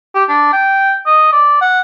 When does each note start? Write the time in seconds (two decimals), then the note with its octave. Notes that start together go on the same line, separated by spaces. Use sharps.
0.15 G4
0.29 D4
0.53 G5
1.06 D#5
1.32 D5
1.61 F#5